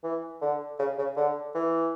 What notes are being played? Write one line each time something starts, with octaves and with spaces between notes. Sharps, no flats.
E3
D3
C#3
C#3
D3
E3